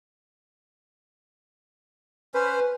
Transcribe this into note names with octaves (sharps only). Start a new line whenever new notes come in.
C#4 B4 C5